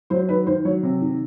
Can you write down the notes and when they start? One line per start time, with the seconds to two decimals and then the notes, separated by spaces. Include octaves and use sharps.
0.10 F#3 C5
0.29 D#3 B4
0.47 D#3 C5
0.65 F#3 C#5
0.83 C3
1.01 D#3